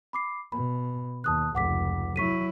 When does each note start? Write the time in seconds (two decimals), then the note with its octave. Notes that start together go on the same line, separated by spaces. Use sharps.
0.13 B5 D6 C7
0.52 B2 B5
1.24 D#2 A5 D#6 F#6
1.55 F1 C#2 F#5 D6 B6
2.16 F#3 E4 C#6 B6 D#7